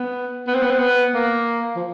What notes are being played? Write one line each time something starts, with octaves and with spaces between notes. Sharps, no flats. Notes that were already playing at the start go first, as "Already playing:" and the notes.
Already playing: B3
B3
C4
B3
C4
B3
A#3
F3